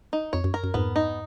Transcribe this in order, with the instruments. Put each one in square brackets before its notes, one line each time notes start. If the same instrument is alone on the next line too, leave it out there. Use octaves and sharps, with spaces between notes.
[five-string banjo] D#4
[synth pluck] F2 [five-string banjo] C#5
[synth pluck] F#2
[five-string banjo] A#4
[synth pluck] F#2
[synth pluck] F2 G#2 [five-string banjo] B3
[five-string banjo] D#4